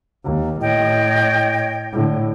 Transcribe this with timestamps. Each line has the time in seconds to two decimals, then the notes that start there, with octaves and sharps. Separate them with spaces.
0.24 D#2
0.60 A2 C#5 D#5 G5
1.93 A2 D3